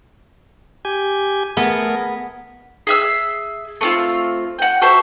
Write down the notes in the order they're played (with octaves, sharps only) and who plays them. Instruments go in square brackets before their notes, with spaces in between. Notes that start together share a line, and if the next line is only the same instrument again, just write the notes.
[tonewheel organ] G4 G#5
[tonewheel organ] A3 G#4 A#4 [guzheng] B3
[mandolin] G#4 E5 E6
A3 C4 F4
F#5 G5
F#4 A4 C5 E5